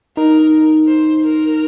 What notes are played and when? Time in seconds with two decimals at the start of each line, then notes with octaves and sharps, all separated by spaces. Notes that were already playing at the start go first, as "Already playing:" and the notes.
0.17 D#4 A#4
0.88 C5
1.24 A#4